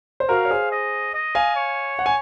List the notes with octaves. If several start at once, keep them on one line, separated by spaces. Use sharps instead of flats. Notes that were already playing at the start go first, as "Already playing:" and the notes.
C5
F#4 A#4 F5
C#5
G#4 C5
D#5
D#5
F5 G#5
C#5
F#5
G#5